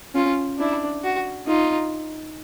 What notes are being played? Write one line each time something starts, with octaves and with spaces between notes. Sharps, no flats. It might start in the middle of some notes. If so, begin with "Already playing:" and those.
C#4 F4
D4 E4
F#4
D#4 F4